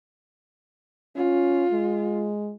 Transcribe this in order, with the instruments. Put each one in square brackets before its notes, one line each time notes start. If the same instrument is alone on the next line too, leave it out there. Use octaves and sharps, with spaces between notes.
[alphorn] C#4 [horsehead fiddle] F4
[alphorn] G#3